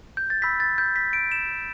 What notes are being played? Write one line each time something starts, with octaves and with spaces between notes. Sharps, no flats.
G6
A6
B5 E6 G6 B6
A6
G6
B6
D7
E7